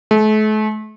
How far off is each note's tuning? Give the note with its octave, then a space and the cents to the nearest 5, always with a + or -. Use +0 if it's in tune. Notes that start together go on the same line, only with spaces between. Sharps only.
A3 -40